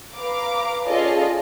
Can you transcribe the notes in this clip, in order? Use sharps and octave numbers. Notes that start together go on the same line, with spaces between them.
B4 F5 A#5 D6
C#4 F4 G#4 A4 D5 D#5